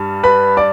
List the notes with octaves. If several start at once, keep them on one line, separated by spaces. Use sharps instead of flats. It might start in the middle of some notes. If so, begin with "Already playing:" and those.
Already playing: G2 G3
B4 B5
D5 D6